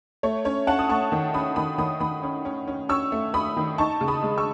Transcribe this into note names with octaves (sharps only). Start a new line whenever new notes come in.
A3 C#5
C#4 C#5
C#4 F#5 A5
D#6
A3 A5 C#6
D#3
C#4 B5 D#6
D#3 B5 D#6
D#3 B5 D#6
D#3 B5 D#6
C#4
C#4
C#4
C#4 C#6 E6
A3
A3 B5 D#6
D#3
D#4 A5 C#6
C#3
B5 D#6
G#3
C#6 E6